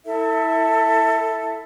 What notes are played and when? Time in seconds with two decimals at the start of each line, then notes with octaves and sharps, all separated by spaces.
0.05 E4 A4 E5